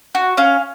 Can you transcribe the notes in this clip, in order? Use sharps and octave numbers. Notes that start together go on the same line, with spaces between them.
F#4
C#4 F5